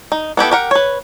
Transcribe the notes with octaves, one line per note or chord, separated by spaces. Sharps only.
D#4
B3 E4 G4 A4
G4 A#4 F#5
B4 C#5